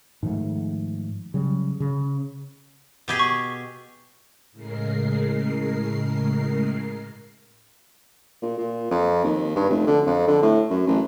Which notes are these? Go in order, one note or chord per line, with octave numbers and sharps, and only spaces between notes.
G#2 D#3 F3 A3
C#3 F#3 G3
C#3
B2 G4 G#4
C#6
A2 C#3 G#3 A#4 C7
A#2
A#2
F2
D#2
G2
F1
D3
F2
D3
A2
F#2
A1